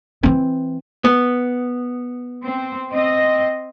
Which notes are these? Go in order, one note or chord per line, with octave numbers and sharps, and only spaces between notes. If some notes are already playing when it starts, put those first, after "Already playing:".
E3 C4
B3
C4
C4 D#5